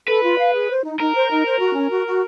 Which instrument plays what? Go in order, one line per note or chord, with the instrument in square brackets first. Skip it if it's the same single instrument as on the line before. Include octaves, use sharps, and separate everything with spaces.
[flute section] A4 [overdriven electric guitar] B4
[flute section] F4
F5
G#4
C5
D#4
[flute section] D#4 [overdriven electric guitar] A#4
[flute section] C5
D#4
C5
F#4
C#4
F#4
F#4